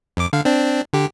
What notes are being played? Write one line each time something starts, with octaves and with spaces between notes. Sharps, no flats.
F2 D6
D3 F5
C4 D4
D3 G4